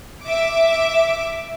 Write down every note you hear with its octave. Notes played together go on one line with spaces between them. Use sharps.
E5 D6